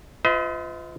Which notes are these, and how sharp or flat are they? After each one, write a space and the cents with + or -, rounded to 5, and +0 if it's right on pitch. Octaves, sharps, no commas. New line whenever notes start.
F4 +0 B4 +45 D#5 +40